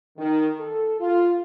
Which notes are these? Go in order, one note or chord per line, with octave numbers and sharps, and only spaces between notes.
D#3
A4
F4